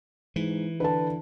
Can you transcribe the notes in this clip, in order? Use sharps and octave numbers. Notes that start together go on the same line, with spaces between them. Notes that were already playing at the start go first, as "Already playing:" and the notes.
G#2 E3
D3 B4 A5